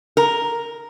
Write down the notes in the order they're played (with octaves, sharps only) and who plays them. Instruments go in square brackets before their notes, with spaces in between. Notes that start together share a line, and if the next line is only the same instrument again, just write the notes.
[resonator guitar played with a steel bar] A#4